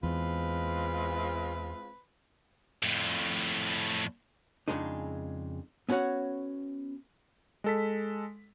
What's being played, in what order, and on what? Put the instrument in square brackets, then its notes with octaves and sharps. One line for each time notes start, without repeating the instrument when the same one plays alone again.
[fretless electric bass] E2 [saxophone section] G#3 C4 F4 [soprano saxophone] B4
[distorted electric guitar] F2 A2
[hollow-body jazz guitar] F2 C#3 G#3 D4 D#4
B3 C#4 F#4 C#5 F#5
[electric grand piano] G#3 A4 B6